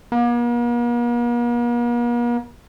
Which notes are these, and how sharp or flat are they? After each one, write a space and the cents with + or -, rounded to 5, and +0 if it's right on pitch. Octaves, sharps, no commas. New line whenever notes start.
A#3 +45